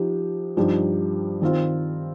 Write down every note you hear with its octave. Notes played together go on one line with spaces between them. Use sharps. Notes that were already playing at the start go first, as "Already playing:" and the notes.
Already playing: F3 D#4 G4
G2 F3 D#4 G4
D#3 C4 F4